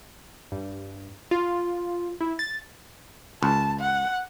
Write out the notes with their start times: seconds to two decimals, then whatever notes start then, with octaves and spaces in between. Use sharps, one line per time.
0.52 G2
1.31 F4
2.21 E4
2.39 A6
3.43 C#2 A5
3.80 F#5